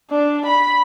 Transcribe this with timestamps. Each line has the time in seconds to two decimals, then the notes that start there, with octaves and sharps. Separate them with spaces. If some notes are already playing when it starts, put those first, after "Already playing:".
0.10 D4
0.46 B5